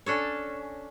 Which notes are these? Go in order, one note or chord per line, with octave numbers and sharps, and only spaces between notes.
C#4 D4 A4 C#5